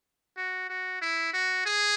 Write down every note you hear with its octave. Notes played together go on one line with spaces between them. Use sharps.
F#4
F#4
E4
F#4
G#4